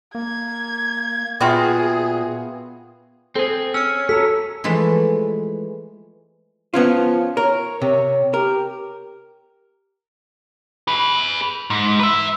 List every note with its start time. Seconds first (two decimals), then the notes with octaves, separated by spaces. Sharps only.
0.15 A#3 G#6
1.41 A#2 B3 F4 F#4 G#4 E5 G5 F#6
3.35 C4 G#4 A4 C5
3.74 C#4 E6 F6 C#7
4.09 F#4 A4 A#5 E6 B6
4.64 E3 F3 G#3 A3
6.74 F3 B3 C#4 F4
7.37 A#4 C#5
7.82 C3
8.34 G4 A#4
10.88 G#4 B4
11.70 G#2
12.00 B4 E5